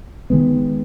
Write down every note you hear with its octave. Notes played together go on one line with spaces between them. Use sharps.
D#3 G#3 B3